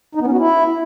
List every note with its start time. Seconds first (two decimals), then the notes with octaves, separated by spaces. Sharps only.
0.15 D#4
0.21 B3
0.27 C#4
0.32 F#4
0.38 E4